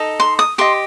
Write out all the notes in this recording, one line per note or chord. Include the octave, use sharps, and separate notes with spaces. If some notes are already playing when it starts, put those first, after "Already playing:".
Already playing: D#4 A4 D#5
C6
D#6
G4 D#5 C6